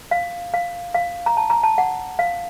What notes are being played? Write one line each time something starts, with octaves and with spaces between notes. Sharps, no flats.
F5
F5
F5
A#5
A5
A#5
A5
F#5
F5